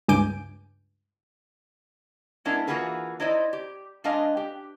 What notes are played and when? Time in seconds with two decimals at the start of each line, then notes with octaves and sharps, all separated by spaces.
0.08 C#2 G2 G#5 D6 G6 D7
2.45 G#3 B3 C#4 D4 E4 A#4
2.67 E3 A#3 F4 F#4 G#4 B4
3.20 D#4 E4 C5 D5 D#5
3.53 G4
4.04 G#3 D4 B4 D#5 F5
4.37 G4